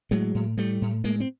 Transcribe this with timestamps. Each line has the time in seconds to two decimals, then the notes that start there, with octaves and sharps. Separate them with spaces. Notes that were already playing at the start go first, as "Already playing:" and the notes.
0.11 A2 F#3 G#3
0.35 A2
0.58 A2 G3 A3
0.82 A2
1.04 A2 G#3 A#3
1.20 C4